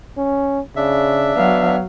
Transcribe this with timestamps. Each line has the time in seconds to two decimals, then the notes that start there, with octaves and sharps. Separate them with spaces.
0.18 C#4
0.76 C#3 D4 E5
1.36 F#3 B3 F5